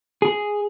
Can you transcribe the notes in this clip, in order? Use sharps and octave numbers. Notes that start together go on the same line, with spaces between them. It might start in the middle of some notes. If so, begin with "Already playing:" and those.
G#4